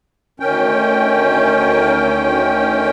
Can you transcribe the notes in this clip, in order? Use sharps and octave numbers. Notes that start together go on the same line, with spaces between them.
D2 D#3 C#4 G5